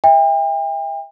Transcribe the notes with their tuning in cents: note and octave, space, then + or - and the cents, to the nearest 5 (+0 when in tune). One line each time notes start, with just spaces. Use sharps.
E5 -20 G5 +40